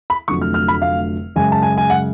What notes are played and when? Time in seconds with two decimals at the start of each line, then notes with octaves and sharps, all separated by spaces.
0.10 B5
0.28 F1 F2 D3 F#3 A3 C#6
0.41 F6
0.54 F6
0.68 B5
0.82 F5
1.36 F#2 C#3 G#3 G#5
1.52 A5
1.63 G#5
1.78 G#5
1.90 F#5